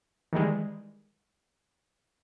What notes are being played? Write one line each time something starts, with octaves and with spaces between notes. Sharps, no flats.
D#3 E3 G3 G#3